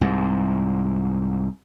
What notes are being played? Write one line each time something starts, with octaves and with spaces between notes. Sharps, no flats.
C2 G#2